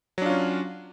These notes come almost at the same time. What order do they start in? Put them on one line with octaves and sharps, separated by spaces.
F#3 D4 F4 C#4